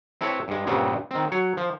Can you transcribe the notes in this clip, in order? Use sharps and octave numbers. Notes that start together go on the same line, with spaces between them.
C4 E4 A4 B4 C#5
G2 G#3
G2 A#2 C#3 G3 B3 C4
D#3 C4
F#3 C#5
F3